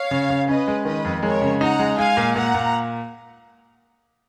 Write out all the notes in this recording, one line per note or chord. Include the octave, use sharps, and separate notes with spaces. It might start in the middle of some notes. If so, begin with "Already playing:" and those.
Already playing: C#5 F5
C#3
C#3
C#4 B4 D#5
G#3
D#3 B4 D#5
F2
G#3 A#4 C#5
C#3
D#4 F#5 A#5
G#3
G#3 F5 G#5
A#2
A#2 F#5 A#5
A#2